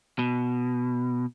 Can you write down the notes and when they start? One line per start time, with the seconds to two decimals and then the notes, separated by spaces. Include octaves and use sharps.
0.19 B2